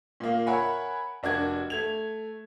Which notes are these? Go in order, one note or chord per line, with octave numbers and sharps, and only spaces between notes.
A#2 A#3
A#4 C#5 E5 F#5 G#5 B5
F1 D4 F#4 A#4 G#6
A3 G#6 F7